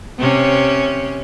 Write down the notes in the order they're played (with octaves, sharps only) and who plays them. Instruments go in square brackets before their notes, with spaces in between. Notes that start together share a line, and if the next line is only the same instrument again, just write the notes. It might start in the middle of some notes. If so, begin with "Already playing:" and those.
[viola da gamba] C3 C#4